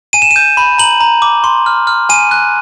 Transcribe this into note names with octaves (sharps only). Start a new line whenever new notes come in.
G#5 D#7
E7
D#7
G6
B5
A#5 F#7
A#5
D6
C6
F6
F6
G#5 D#7
F#6